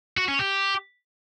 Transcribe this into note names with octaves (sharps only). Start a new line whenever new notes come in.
F#4
C#4
G4